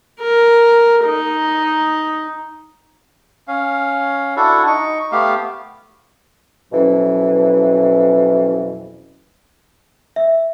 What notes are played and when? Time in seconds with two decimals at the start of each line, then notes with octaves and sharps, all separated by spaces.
0.20 A#4
1.05 D#4
3.48 C#4 F5
4.36 D4 E4 F#4 A4
4.66 D#4 C#6
5.12 A3 B3 G4 F5
6.72 F2 B2 E3 F#3 C#4
10.16 E5